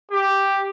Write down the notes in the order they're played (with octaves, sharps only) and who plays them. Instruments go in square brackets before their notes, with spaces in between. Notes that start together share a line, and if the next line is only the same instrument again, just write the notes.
[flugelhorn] G4